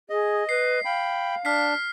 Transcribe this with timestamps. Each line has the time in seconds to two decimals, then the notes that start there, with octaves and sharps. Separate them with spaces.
0.10 G#4 D#5
0.49 B4 C7
0.85 F5 G5 B5
1.45 D4 F6 B6 C7